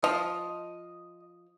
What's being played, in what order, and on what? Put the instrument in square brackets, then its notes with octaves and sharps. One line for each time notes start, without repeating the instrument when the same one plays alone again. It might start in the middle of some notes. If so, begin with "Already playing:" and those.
[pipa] F3 [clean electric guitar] D#5